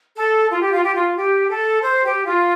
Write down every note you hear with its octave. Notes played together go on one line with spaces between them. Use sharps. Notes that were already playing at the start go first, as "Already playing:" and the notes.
A4
F4
G4
F4
G4
F4
G4
A4
C5
G4
F4